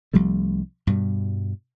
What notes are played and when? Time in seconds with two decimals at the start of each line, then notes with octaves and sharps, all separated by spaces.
0.14 C2 F3 G3 A3
0.87 G2 B2 G3